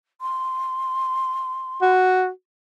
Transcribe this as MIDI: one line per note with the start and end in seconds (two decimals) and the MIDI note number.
0.21 1.92 84
1.82 2.29 66